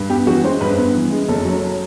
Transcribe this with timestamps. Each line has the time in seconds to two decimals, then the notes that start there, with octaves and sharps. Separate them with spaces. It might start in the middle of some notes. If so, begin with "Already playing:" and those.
Already playing: G2
0.09 B3 G4
0.27 E3 F#4
0.44 G#3 C5
0.60 G2 B4
0.78 B3
0.95 E3
1.11 G#3
1.28 F#1 A4
1.45 F#3